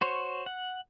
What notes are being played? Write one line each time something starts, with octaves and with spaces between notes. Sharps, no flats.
F#4 C5 C#5
F#5